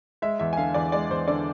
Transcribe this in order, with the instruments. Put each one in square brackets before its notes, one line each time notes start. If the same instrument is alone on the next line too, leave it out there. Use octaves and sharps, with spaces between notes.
[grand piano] G#3 E5
E2 E5
G#5
D3 F5
E2 D5
G#3 D5
E2 C5
D3 D5